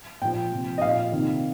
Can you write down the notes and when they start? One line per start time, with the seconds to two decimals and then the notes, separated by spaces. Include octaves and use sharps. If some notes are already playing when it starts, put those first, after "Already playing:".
0.21 A#2 F3 G5
0.52 C3 F3
0.78 D#5
0.82 A#2 F3 F5
1.12 C3 D#3